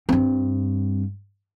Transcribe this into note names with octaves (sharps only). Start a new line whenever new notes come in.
G2 C4